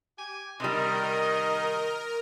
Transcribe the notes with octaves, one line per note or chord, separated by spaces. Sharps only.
G4 G#5
C3 D#3 G3 A#4 D#5